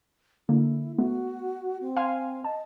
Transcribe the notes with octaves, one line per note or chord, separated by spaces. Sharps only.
D3 A#3 E4
A3 B3 F#4
C4
F5 G#5 C6
D#5 A5